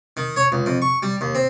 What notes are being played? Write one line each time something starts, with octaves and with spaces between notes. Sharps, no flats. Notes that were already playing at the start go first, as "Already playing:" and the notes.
D#3
C#5
C#2
F2
C#6
G3
D#2
C4